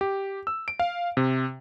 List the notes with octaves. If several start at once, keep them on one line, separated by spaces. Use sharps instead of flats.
G4
E6
D7
F5
C3